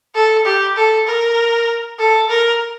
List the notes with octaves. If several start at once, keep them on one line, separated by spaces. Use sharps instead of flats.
A4
G4
A4
A#4
A4
A#4